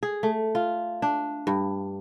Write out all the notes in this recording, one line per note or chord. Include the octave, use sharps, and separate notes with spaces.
G#4
A3
F4
D4
G2